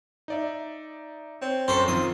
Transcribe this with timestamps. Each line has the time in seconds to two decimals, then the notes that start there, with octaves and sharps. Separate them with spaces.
0.28 D#4 D5 E5
1.42 C4 C#5
1.68 F#2 A4 C5 C#6 C7
1.88 D#3 F3 C4 D#6